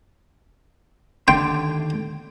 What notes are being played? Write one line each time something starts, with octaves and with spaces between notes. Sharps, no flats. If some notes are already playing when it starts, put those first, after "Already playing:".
D#2 D3 G5 C6